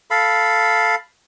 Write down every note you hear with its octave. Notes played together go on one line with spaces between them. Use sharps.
A4 F5 B5